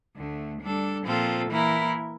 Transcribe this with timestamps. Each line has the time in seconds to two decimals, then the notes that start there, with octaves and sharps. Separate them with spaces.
0.16 D2 D3 A3
0.61 G3 D4 A4
1.05 A#2 F3 C4 F4 A4
1.49 E3 A#3 E4 A#4